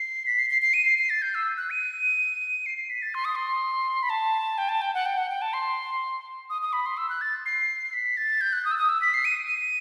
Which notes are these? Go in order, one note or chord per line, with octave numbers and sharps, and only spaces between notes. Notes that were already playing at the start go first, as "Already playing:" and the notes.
Already playing: C7
B6
C7
C7
C7
D#7
C7
C7
A6
G6
E6
F#6
D#7
C7
C7
B6
A6
C6
D#6
C6
B5
A5
G5
A5
G5
F#5
G5
F#5
G5
A5
C6
D#6
D#6
B5
C6
E6
F#6
A6
C7
B6
A6
G6
F#6
D#6
E6
D#6
E6
B6
C7
D#7
D#7